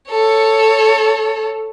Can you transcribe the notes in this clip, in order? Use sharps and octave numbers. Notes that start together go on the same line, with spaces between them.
A4 C#5